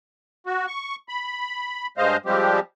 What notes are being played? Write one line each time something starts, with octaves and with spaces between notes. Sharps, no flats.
F#4
C#6
B5
G2 G#3 C5 D#5 F5
F3 G3 G#3 C4 G4